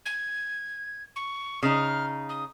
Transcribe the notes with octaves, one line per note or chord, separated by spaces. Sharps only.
G#6
C#6
C#3 D#4 F6
D#6